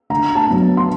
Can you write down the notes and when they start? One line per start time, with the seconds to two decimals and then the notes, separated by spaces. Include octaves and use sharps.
0.10 D3 A#5
0.35 A5
0.48 F#3 B3
0.77 C6